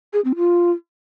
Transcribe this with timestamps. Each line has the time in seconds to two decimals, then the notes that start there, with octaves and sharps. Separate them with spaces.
0.13 G#4
0.25 C4
0.36 F4